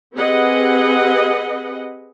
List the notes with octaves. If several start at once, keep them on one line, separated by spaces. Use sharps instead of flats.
C4 G4 G#4 B4 D#5 F#5